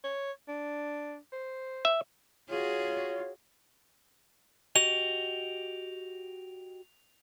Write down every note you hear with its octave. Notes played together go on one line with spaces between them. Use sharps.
C#5
D4
C5
E5
F4 F#4 G#4 C#5
F#4 G4 D#5 F7